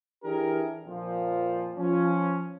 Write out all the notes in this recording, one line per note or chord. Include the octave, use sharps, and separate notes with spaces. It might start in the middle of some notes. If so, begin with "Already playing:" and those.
E3 D4 E4 G4 G#4 A#4
F2 A#2 F3
F3 C#4